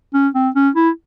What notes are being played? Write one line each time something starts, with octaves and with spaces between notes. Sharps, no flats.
C#4
C4
C#4
E4